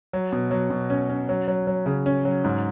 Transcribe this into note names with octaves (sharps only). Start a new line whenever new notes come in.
F#3
B2
F#3
B2
C#4
C#4
F#3
F#3
F#3
C#3
C#4
F#3
G#2